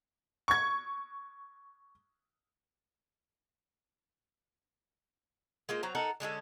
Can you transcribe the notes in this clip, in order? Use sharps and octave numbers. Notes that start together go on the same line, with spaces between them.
C#6 G#6
G#3 A#3 F4 C5
F#3 C4 A#5
D#4 A4 A#4 F#5
D3 G#3 C#4 A4